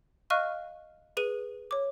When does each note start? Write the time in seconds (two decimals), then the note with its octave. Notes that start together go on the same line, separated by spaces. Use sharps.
0.30 D#5 F5 C#6 F6 F#6 D#7
1.17 G#4 B4 D#7
1.71 C#5 D6